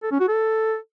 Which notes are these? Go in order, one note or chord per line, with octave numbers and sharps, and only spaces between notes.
A4
C#4
F#4
A4